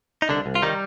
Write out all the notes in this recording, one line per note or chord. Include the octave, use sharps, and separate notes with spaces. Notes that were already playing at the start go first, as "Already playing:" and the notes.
D#4
C2 D3 D4
C2
F4
D#3 G3 D#4